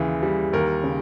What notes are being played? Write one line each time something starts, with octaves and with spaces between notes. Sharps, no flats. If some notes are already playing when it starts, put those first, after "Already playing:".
Already playing: D#2 C#3 E3
G3
D#2 A#4
C#3